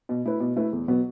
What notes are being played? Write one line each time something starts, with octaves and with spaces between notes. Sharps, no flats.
B2
A3 E4 B4
B2
A3 E4 B4
E2
B2 F#3 B3